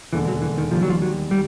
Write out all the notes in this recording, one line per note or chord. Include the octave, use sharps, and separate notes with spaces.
E1 D#2 D3 E3
F#3
E3
D#3
D#2 D#3 F3 G3
F#3
F3
F#3
G3